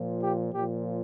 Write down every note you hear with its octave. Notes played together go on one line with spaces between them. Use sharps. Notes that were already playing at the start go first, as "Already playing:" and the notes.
Already playing: A#2 F3
G4
A#2 F3 G4